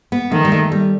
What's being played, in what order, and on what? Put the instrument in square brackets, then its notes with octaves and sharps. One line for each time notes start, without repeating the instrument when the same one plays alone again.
[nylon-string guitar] B3
[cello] D#3 [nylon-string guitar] A3
[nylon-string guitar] G3
A3
G3